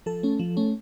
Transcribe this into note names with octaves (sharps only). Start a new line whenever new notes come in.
F3 A4
A3 C#4
F3
A3 C#4